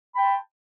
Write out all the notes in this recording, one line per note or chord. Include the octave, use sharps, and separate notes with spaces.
G5 A5 B5 C6